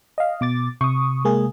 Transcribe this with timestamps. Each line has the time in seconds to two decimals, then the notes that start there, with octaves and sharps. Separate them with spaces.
0.18 D#5 F5
0.41 B2 D6 A6
0.81 C3 C#6 D#6
1.25 G#3 A#3 G#4